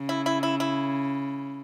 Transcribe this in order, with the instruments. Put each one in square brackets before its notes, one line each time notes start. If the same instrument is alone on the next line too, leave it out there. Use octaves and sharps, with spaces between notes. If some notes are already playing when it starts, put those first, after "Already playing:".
Already playing: [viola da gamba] C#3
[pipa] E4
E4
E4
E4